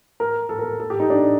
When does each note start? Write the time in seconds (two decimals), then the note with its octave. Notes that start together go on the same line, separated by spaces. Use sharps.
0.20 A#4
0.49 A4
0.59 A#4
0.80 A4
0.90 G4
1.00 D#4
1.10 D4